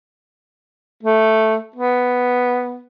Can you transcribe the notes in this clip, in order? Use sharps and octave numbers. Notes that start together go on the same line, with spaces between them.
A3
B3